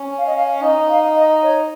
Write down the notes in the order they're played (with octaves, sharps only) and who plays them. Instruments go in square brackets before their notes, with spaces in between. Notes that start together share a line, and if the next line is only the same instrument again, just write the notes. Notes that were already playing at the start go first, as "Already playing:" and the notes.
Already playing: [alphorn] C#4
[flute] F5
D#5
F5
[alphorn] D#4 [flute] D#5
[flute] F5
D#5
C#5